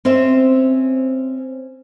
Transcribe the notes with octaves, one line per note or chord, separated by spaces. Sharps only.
C4 C#4 C5 E5